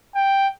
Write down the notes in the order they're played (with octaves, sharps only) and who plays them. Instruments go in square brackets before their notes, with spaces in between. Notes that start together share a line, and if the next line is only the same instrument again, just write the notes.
[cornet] G5